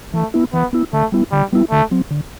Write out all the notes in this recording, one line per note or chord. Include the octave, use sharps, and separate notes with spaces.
E3 A3
B3 E4
E3 B3
B3 E4
D3 A3
G3 B3 E4
D3 G3
G3 B3 E4
D3 A3
F#3 C4
D3